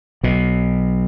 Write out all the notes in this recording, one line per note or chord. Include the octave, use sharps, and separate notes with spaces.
B1 B2